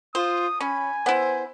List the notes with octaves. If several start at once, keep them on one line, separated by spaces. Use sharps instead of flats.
F4 C5 D#6
C#4 G#5 B5
B3 E4 C5